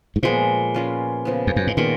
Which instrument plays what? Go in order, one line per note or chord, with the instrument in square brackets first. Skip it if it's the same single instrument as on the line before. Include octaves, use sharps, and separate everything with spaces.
[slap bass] G#2
[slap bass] A#2 [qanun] F3 G#3 B3
[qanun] G#3 C#4 F4 B4
C#3 F3 B3
[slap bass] F2
F#2
G#2
[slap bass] A#2 [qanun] D#3 G#3 B3 F4